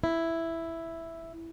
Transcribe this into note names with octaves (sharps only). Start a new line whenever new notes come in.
E4